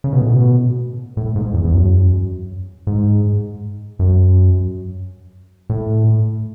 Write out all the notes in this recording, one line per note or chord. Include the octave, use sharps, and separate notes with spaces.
C#3
B2
A2
B2
A2
G#2
E2
E2
F#2
G#2
F#2
A2